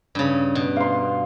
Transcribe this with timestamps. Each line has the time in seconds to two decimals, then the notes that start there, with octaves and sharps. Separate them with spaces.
0.15 G2 C#3
0.55 B2
0.76 F5 C6